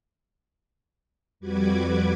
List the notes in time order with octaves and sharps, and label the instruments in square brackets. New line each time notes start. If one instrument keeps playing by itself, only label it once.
[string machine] F2 G3 F#4 B4 D6 G#6